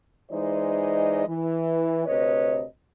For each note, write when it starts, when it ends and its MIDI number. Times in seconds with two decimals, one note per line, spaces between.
0.31 1.24 52
0.31 1.24 56
0.31 1.24 63
0.31 1.24 72
0.31 1.24 74
0.31 1.24 75
1.27 2.04 52
2.06 2.63 38
2.06 2.63 48
2.06 2.63 71
2.06 2.63 73
2.06 2.63 75